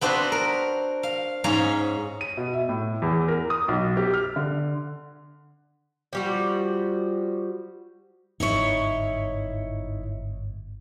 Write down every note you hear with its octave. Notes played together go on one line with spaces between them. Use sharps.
B3 C4 D4 F#4 B4 C5
A#4
F5
G#2 C#4 C#5 D#5 F5 A#5
D#7
B2
E5
A2
E2
A#4
D#6
B1
G4
F6
D3
F3 G3 F#4
G1 G#2 D#4 E4 C#5